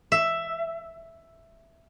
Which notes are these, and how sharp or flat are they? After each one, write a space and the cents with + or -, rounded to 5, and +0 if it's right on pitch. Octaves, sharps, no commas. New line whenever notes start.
E5 +5